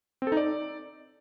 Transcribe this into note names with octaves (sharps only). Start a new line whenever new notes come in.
C4
A4
D#4
D5